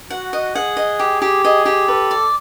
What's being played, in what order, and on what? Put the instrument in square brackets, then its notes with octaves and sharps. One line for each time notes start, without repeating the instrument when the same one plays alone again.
[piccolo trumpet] F#4 [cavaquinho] F#5
[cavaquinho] D#5
[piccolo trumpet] G#4 [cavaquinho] F#5
[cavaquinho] D#5
G4
G4
[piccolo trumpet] G#4 [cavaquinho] D#5
[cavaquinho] G4
[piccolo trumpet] A4 [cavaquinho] B4
[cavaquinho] D5